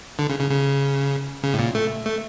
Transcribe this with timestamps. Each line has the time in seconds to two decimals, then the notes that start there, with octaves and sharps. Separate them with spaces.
0.19 D3
0.30 C#3
0.40 C#3
0.51 C#3
1.43 C#3
1.54 A2
1.59 A#2
1.75 A3
2.06 A3